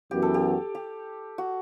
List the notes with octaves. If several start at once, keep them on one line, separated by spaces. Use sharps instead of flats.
F#2 E3 B3 F#4 G4
A4
G4
G4
F#4